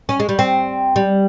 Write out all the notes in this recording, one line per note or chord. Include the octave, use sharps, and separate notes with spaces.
C#4
G#3
G3
C4
G3